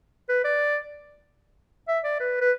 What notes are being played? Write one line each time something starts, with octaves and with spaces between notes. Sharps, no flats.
B4
D5
E5
D5
B4
B4